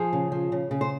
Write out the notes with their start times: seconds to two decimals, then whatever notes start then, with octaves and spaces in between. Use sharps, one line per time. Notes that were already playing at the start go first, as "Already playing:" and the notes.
Already playing: F3 G#4
0.13 C#3
0.32 F3
0.52 C#3
0.71 C#3
0.81 C5